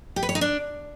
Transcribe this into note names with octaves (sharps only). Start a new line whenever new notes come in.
G4
B4
C#5
D#4
D4